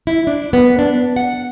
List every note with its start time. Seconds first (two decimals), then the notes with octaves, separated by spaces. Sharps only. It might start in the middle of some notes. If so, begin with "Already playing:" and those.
0.07 E4
0.27 D4
0.53 B3
0.79 D4
1.16 F#5